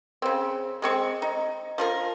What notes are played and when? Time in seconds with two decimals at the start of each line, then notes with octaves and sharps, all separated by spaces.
0.22 C#3 C4
0.82 G#3 C4 C#6
1.22 D#4
1.78 F3 F4 A#4